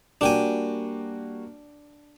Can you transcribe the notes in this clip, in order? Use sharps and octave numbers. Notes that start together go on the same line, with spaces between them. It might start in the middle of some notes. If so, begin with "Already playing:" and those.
G3 A#3 D4 F#4 G5 G#5